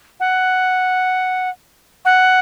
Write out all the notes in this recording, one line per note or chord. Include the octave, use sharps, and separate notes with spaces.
F#5
F#5